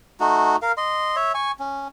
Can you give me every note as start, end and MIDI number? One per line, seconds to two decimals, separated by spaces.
0.20 0.56 57
0.20 0.56 63
0.20 0.56 66
0.62 0.72 70
0.62 0.72 77
0.77 1.16 75
0.77 1.16 84
1.16 1.32 73
1.16 1.32 76
1.35 1.52 80
1.35 1.52 85
1.59 1.88 61